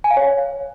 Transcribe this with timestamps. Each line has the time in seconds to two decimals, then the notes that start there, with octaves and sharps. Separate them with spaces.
0.04 G#5
0.11 F5
0.17 C#5